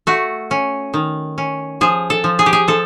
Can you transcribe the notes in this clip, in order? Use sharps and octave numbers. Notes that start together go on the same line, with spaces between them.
A3 F#4
C#4
D#3
C#4
F3 G#4
A4
F3
G#4
G4
G#4
F3 A4